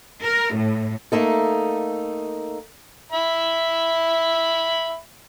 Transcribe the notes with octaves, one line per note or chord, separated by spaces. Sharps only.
A#4
A2
A3 A#3 D#4 A4
E5 B5